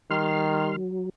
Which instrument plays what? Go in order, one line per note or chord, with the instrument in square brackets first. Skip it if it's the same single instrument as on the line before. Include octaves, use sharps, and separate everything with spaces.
[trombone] D#3 [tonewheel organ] G3 C6 F6
[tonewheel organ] F#3